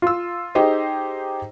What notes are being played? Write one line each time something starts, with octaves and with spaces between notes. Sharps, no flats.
F4 E6
D#4 G4 G#4 C5 D#5